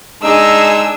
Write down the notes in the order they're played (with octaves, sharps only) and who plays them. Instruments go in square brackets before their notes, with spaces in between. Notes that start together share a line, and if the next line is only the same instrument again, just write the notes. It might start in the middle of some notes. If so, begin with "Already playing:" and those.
[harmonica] G#3 D#4 [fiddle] D4 [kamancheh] G#5 E6